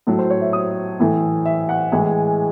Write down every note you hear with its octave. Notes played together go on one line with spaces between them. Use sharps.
A2 F#3 A3 A4
C5
C#5
E5
D#6
A2 E3 A3
E5
F#5
A2 E3 G#3 G#5